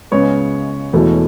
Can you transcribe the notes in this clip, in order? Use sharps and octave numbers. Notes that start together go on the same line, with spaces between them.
C#2 C#3 G#3 B3 C#5
E1 E2 B2 A3